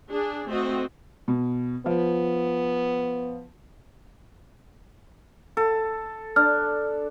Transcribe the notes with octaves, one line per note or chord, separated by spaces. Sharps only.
D4 G#4
A3 C4 F#4 D#5
B2
F3 B3
A4
D4 F6